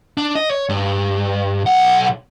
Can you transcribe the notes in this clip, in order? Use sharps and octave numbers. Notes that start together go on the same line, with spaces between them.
D4
D#5
C#5
G2
B1 F#5